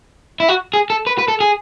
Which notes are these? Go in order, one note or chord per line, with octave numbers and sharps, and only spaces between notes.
E4
F#4
G#4
A4
B4
B4
A4
G#4